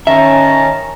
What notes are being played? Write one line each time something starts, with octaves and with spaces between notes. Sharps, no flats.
D#3 C#4 E5 A5 A#5